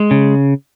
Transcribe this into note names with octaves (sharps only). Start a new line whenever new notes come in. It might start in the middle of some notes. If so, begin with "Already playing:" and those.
Already playing: G#3
C#3